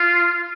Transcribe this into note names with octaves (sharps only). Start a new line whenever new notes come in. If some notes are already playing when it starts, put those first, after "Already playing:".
Already playing: F4